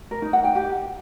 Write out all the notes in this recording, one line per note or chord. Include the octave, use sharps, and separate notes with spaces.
A#4
D#4
F#5
G5
G4